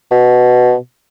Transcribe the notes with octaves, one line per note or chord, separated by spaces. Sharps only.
B2